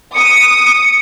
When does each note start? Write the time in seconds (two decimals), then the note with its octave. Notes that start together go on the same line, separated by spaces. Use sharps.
0.15 D#6 C#7